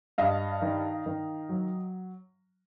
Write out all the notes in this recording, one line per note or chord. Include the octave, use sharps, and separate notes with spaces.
G2 D#5 F5
D#3
D#3
F#3